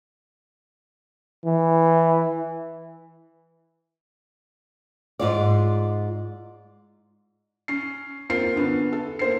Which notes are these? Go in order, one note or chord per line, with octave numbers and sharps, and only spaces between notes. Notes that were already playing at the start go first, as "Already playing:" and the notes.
E3
G#2 F4 D5
C#4 C7
A#3 C4 F4 C7
D3 B3 C#4
A4
A#3 C5 C7